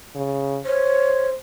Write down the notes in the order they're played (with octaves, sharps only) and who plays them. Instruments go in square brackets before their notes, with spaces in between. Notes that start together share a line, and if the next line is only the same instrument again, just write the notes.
[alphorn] C#3
[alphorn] C5 [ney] C#5